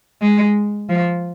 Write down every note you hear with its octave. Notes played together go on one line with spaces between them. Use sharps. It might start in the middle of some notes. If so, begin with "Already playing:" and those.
G#3
F3